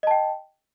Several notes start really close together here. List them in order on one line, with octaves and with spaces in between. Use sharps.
D#5 A5 G5